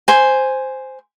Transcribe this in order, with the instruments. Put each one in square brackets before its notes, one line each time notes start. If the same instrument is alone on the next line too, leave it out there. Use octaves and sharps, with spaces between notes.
[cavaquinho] C5 G#5